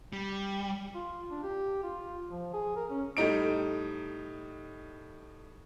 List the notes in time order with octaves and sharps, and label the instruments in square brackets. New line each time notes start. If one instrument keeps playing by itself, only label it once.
[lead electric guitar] G3
[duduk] F4
D4
G4
F4
F3
G#4
A#4
C#4
[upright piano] A2 G3 D#4 D7